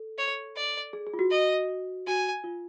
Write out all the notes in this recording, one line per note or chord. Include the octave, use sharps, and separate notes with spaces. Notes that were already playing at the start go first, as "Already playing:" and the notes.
Already playing: A4
C#5
D5
G#4
G#4
F4
F#4
D#5
F#4 G#5
F4